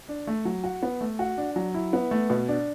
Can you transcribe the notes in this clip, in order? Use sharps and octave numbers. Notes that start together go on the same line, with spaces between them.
D4
A3
F#3
F#4
B3
A3
F#4
D4
F#3
E4
B3
A3
B2
D4